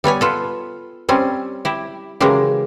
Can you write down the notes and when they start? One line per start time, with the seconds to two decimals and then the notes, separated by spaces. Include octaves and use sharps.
0.04 G3 B3 C#5 G#5
0.21 B3 F4 A4
1.09 G3 C4 C#4
1.65 E4 G4
2.20 C#3 E3 F#3 G#3 A#3 G4